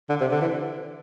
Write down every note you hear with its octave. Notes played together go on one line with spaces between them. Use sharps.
D3
C3
D3
E3